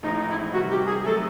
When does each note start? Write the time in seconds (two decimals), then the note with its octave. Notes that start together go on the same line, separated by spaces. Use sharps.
0.03 A1 A2 F3 G#3 D#4
0.16 D#4
0.29 E4
0.53 C3 D#3 G3 F#4
0.70 G4
0.87 G#4
1.05 D#3 F#3 A3 A4